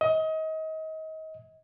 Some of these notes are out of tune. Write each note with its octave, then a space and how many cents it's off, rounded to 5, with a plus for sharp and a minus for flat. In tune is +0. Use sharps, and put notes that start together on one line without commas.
D#5 +30